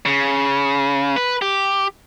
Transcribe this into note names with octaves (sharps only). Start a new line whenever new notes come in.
C#3
B4
G4